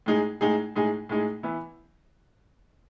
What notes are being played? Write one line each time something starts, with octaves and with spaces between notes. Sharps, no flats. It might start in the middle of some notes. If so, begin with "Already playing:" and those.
A2 G#3 D#4 G#4
A2 G#3 D#4 G#4
A2 G#3 D#4 G#4
A2 G#3 D#4 G#4
E3 B3 E4